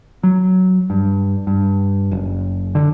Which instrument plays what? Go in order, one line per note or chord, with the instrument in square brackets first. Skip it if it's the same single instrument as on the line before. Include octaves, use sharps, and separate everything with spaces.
[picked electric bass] F#3
G2
G2
F#1
D3